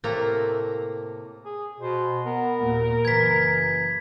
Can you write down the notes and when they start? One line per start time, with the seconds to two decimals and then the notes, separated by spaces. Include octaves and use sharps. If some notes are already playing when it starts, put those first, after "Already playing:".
0.04 A2 C3 A3 A#3 A#5
1.45 G#4
1.80 B2 C5
2.25 B3 A#4
2.60 D#2 A#2
3.05 F#1 E3 G#6 B6